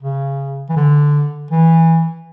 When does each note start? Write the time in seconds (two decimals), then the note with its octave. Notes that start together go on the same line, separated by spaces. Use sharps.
0.02 C#3
0.69 E3
0.77 D3
1.51 E3